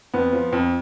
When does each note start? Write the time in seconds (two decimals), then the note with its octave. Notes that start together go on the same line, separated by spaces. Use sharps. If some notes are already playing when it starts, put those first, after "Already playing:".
0.14 F2 B3
0.33 F3
0.53 F2